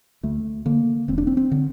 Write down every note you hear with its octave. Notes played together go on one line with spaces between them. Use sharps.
D2 A3
D3 A#3
E1 C4
D4
C4
C4
D3